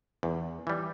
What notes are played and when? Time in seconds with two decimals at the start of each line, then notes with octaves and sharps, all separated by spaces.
0.23 E2
0.67 E3 G3